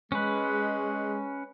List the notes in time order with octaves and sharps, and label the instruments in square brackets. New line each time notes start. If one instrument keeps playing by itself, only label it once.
[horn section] G#3 [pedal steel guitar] C#4 B4